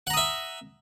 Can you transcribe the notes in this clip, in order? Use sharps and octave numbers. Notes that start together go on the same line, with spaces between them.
E5 F#5 A#5 D#6